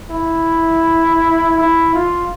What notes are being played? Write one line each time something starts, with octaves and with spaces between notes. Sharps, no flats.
E4
E4
F4